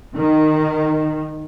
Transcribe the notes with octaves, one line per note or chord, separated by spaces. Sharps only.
D#3